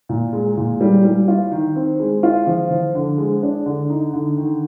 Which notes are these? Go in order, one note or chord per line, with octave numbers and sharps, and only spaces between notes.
A#2
G#3
A#2
G3
G3
F4
D#3
C4
G#3
F4
F3
F3
D3
G#3
D4
D3
D#4
D3
D#3